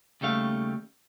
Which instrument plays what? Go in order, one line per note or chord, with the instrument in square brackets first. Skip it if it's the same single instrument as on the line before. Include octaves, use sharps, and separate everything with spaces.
[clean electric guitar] D#2 C#3 G3 A3 F5